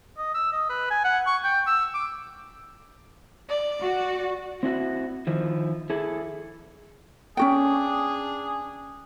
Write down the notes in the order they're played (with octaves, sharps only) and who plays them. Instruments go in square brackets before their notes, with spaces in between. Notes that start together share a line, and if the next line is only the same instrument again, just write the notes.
[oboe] D#5
E6
D#5
B4
G#5
F#5
C#6
G5
E6
D6
[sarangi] D5
[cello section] F#4
[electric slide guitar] C4 E4 F#4 F#5
D#3 F3 E4
E4 G#4 A4
[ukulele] C#4 F#4 G5 [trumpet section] D4 G#4